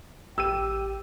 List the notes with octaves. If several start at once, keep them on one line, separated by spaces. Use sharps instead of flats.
A1 G4 G5 E6 D#7